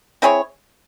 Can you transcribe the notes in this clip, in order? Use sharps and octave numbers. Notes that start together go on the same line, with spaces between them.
C4 E4 G#4 C#5